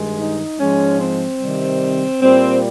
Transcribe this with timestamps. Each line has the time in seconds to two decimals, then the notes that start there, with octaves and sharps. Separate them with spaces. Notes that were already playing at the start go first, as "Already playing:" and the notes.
Already playing: G2 D#3 G#3
0.18 D#4
0.58 G#2 F3 G#3 C#4
1.00 C4
1.40 C3 D#3 G3
2.20 A#2 G3 C4